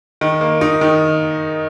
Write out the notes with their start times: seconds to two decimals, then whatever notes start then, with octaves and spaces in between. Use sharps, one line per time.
0.21 D#3
0.41 A#3
0.61 D#4
0.81 D#3